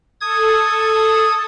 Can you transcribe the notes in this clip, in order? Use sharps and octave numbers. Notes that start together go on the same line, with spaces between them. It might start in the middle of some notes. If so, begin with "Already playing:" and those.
A4 D#6 G#6